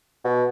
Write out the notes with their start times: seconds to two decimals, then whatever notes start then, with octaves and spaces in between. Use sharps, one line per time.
0.25 B2